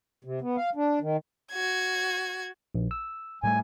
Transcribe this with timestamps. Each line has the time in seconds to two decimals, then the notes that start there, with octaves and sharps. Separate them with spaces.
0.24 C3
0.41 B3
0.57 F5
0.75 D4
1.01 D#3
1.52 F#4 G#6
2.75 A#1
2.91 E6
3.43 A2 G3 A3 G#5